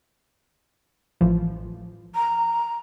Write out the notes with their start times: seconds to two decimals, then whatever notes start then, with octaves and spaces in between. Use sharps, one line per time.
1.21 A1 E3 F3
2.15 A#5